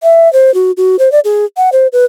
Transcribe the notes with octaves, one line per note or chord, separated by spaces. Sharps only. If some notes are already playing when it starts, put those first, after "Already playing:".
E5
C5
F#4
F#4
C5
D5
G#4
F#5
C5
B4